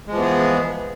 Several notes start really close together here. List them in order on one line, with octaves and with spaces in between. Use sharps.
G#3 F3 E3 B3 G#4